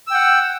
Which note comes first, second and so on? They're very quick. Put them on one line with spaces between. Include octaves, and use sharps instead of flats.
E6 G5 F#5